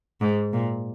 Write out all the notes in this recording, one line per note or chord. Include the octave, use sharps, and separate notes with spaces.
G#2
A#2